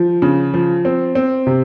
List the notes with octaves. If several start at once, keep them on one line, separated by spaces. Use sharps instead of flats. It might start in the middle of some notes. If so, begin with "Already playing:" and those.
Already playing: F3
C#3
F3
C4
C4
C3